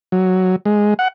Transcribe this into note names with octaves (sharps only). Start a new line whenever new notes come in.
F#3
G#3
F#5